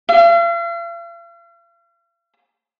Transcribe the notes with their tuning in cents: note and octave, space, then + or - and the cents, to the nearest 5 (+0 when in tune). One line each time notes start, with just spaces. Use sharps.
F5 -45